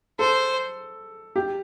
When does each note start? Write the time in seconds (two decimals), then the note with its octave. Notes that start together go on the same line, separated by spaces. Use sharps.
0.19 A4 C5
1.36 G4